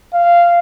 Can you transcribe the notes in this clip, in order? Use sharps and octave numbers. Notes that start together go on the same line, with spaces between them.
F5